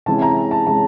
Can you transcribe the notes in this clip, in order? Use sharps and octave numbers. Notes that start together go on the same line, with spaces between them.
C3 E3 G#3 C#4 A5
A#5
A5
C3 E3 G#3 C#4 A5